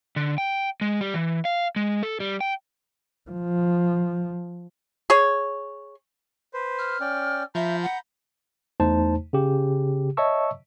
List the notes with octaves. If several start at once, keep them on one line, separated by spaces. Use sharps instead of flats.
D3
G5
G#3
G3
E3
F5
G#3
A4
G3
G5
F3
G#4 C#5
B4 C5
F6
C#4 D5 G5
F3 E5 A#5 B5 G6
F#5
E2 A3 D#4 C5 A5
C#3 G4
C#5 D#5 E5 A5 C#6 E6